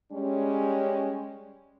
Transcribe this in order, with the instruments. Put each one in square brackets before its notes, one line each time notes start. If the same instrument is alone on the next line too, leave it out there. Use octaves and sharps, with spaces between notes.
[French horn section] G3 G#3 C#4